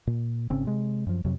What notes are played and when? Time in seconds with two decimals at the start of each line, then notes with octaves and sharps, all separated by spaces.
0.07 A#2
0.50 G#1 C#3 C4 C#4
0.65 C3 G#3
1.06 F#2 F3
1.25 F2 C3 F#3